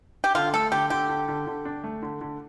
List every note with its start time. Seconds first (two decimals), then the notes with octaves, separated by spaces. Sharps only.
0.24 G4
0.35 D3 F4
0.54 A3 A4
0.72 D3 G4
0.90 D3 G4
1.09 D3
1.28 D3
1.47 D3
1.65 D4
1.84 A3
2.02 D3
2.21 D3